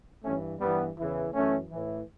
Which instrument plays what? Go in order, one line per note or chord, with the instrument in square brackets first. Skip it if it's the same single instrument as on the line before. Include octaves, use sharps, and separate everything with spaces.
[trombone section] G2 E3 A3 C#4
G2 E3 G3 B3
E2 C#3 E3
F#2 E3 A3 C#4
A2 E3